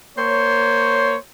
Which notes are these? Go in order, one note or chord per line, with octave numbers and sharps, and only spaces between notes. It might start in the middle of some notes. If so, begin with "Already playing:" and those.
A#3 C5 C#5